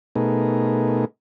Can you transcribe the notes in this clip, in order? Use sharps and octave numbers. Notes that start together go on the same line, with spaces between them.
B2 A3 B3 D#4 G#4 A#4